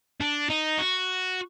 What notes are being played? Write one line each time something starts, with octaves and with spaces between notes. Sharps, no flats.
D4
D#4
F#4